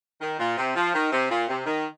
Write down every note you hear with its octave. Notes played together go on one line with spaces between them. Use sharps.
D#3
A#2
C3
F3
D#3
C3
A#2
C3
D#3